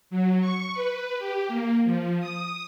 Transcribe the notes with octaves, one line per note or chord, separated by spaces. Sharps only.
F#3
C#6
B4
G4
A#3
F3
D#6